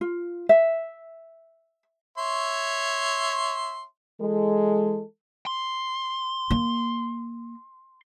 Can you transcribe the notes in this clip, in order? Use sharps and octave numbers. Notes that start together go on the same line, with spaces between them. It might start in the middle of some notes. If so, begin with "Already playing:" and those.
F4
E5
C#5 E5 C6
E3 G#3 A4
C6
A#3